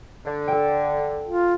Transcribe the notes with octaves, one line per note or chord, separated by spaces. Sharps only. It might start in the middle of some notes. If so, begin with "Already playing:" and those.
D3
A4 G5
F4